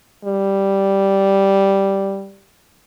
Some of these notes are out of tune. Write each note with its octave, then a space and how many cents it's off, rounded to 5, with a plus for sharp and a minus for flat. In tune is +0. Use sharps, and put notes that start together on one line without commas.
G3 -5